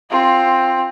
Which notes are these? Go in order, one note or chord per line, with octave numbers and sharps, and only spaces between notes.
C4 F4